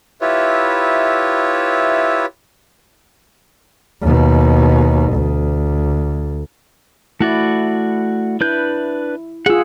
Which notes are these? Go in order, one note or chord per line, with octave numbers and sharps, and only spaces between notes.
E4 F4 G4 B4 C#5 E5
D#2 B2
D2
A3 E4 F#4 D5
D4 E4 B4 G6
F4 G#4 F#5 E6